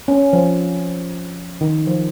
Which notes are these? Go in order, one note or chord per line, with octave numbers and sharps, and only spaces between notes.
C#4
F3
D#3
F3